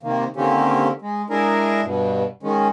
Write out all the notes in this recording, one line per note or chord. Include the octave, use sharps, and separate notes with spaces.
C3 D#3 A#3
D3 D#3 A#3 C4 C#4 G4
G#3
G#3 D4 E4 G#4 A#4
G2 B2
D#3 G#3 C#4